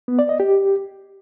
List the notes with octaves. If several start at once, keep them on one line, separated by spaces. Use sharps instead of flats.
B3
D5
D#5
G4